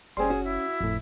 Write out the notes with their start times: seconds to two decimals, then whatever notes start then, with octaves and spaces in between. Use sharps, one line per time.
0.17 F#1 G3 C4 C#4 G#4 C6
0.30 C#4 F#4
0.44 E4
0.80 G1 F2 A2